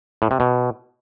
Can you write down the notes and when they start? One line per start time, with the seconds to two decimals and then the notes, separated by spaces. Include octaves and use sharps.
0.22 A2
0.31 C3
0.40 B2